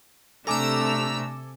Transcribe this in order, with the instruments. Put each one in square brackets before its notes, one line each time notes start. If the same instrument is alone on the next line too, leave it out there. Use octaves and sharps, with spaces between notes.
[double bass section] C3 [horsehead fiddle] A3 D4 [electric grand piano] A4 G#5 D6 [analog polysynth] A#5 E6